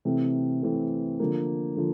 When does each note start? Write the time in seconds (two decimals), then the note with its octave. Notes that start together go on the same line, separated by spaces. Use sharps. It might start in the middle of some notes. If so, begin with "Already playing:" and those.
0.05 C3 E3 A3 C4
0.63 C3 E3 A3 C4
1.20 D3 F3 A#3
1.76 D3 F3